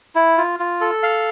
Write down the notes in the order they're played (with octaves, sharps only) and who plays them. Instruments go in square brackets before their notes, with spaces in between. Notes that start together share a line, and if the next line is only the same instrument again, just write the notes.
[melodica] E4
F4
F4
A4
F5